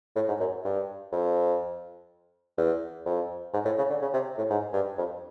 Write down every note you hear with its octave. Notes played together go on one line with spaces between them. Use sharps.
A2
G#2
F#2
G2
F2
E2
F2
G#2
A2
C#3
D3
C#3
C3
A2
G#2
G2
F2